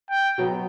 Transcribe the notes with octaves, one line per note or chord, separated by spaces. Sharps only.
G5
B2 F#3 B3